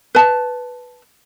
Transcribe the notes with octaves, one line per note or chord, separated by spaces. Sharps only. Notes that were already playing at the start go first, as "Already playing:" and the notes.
B4 A5